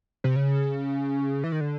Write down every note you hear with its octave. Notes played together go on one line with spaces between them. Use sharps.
C3
C#3
E3
D#3
D3